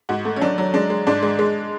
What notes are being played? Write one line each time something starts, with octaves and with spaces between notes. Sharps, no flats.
G#2 F#4
A3
C#4
F#3 D4
F#3
G#3 D4
G#3
G#2 D4
G#3
G#3